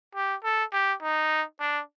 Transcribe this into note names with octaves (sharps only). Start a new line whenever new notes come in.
G4
A4
G4
D#4
D4